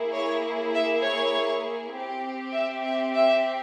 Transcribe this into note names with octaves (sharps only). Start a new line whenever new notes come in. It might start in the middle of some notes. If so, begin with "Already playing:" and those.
Already playing: A#3 E4 G#4
C#5
E5
C#5
C4 G4
E5
E5
E5